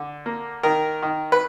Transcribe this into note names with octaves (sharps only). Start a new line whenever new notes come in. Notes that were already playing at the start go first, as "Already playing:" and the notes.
Already playing: D3
A#3
D#3 A#4
D#3
B4